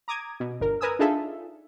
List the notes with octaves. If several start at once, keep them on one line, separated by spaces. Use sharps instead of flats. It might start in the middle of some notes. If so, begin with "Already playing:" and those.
A#5 D6 D#6 G#6
B2
G1 A#4
A#4 B4 G#5 D#6 E6
D4 D#4 F4 G#4 A4 E5